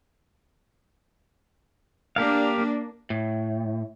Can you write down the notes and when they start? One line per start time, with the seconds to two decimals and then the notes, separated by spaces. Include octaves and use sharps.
2.16 A#3 D4 G4 A#4 F5
3.10 A2